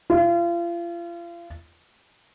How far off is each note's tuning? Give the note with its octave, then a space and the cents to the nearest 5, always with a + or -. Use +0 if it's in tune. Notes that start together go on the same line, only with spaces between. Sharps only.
F4 -35